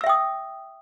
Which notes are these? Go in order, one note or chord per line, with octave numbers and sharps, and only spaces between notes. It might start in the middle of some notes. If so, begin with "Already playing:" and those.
E5 G5 D#6 E6